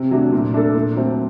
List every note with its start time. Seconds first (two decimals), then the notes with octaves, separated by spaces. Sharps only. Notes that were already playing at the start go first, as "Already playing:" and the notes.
Already playing: C3
0.11 F#3 A3 D4
0.33 A#2
0.54 A3 D4 A4
0.75 A#2
0.96 F#3 A3 C4